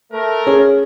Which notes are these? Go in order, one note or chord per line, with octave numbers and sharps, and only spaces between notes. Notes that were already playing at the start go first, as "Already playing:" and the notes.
A3 A#4
C#4 G#4